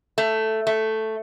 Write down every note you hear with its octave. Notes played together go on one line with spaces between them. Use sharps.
A3
A3